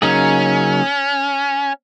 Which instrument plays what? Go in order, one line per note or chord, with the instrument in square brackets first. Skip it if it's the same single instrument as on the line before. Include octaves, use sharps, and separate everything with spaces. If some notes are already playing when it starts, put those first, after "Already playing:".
[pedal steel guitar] C#3 F#3 A#3 D#4 G#4 [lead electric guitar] C#4